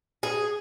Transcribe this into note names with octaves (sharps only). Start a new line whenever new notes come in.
G#4